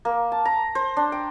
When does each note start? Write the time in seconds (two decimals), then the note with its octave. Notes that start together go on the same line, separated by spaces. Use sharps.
0.05 A#3
0.32 A5
0.45 A#5
0.75 C5
0.97 D4
1.12 G5